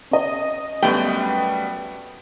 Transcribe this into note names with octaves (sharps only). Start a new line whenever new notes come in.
C#4 D#5
F#2 G3 A3 B3 G5